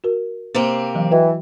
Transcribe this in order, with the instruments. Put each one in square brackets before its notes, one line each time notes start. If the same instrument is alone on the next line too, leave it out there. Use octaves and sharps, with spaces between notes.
[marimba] F#4 A#4
[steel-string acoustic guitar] C3 A#3 C4
[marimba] E3 F#3
[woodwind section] E3 [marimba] F#4 D#5 G5